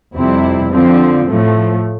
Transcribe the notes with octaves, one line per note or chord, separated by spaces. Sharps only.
F2 C3 G3 C4 E4
D3 F3 C4
A2 F3 A3